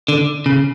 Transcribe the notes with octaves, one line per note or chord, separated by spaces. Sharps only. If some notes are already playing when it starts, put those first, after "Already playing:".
D3
C#3